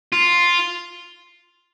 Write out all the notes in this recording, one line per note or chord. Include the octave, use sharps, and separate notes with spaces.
F4